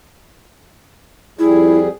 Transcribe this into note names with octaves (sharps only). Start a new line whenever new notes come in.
F2 G3 E4 G#4